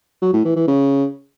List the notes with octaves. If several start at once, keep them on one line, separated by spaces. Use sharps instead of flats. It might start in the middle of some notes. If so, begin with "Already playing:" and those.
F#3
A2
E3
E3
C#3